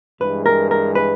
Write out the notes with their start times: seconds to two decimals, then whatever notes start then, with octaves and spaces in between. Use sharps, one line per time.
0.21 G2 E3 G#3 B4
0.46 A#4
0.71 A#4
0.95 B4